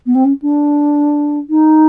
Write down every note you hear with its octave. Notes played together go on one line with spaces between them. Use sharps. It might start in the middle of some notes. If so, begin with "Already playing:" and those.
B3
C4
C#4
D4
D#4